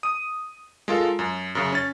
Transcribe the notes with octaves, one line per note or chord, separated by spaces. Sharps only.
D#6 D#7
G#3 F4 A4 A#4
F#2
F#2 C#3
C#4 A6